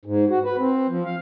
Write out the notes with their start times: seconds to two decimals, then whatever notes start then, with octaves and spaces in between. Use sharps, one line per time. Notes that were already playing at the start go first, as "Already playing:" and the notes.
0.05 G#2
0.30 F#4
0.45 B4
0.58 C4
0.89 F3
1.05 F5